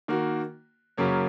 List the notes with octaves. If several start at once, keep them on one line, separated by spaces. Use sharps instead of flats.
D#3 A#3 F#4
F#2 C#3 F#3 A#3 C#4